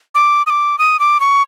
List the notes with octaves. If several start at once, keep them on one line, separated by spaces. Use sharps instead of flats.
D6
D#6
D6
D#6
D6
C#6